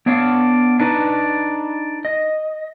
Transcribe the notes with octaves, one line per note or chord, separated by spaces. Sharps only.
B3 D4 C#5 F5
D4 D#4 B4
D#5